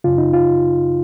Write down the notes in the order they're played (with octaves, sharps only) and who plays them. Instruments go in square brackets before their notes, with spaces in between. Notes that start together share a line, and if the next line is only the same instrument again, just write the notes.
[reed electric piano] F#2 C#3 F4
D#4
F4